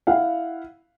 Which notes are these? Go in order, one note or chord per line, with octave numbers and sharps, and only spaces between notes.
E4 F5 F#5